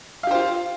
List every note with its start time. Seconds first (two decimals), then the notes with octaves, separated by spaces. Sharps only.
0.23 F5
0.27 G4
0.31 C5
0.35 F4